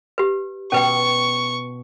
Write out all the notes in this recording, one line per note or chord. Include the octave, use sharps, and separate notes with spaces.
G4 B4
B2 C#4 B4 G5 C#6